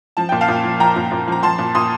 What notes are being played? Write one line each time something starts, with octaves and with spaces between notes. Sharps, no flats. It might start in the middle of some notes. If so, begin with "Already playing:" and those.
F3 A5
A#2 G5
F5 A5
A#2
F3
F3 G5 A#5
A#2
A#2
F3 A#5
F3 A5 C6
A#2
A#2 C6 D#6